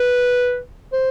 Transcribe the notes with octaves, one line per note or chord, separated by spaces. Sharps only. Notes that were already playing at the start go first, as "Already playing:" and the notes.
Already playing: B4
C5